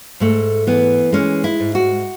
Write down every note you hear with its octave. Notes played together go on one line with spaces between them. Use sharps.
G#2 A3
E3 B3
G#3 C#4
E4
G#2
F#4